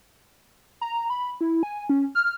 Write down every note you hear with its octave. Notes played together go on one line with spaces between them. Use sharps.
A#5
B5
E4
G#5
C#4
F6